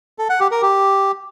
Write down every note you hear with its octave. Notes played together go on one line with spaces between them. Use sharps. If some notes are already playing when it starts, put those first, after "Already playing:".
A4
F#5
G4
A#4
G4